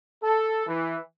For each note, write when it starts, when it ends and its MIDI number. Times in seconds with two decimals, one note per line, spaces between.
0.22 0.62 69
0.66 0.97 52